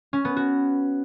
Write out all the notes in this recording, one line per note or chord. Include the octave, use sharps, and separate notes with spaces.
C#4
B3
F#4